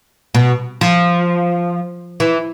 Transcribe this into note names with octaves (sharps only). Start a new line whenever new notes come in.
B2
F3
E3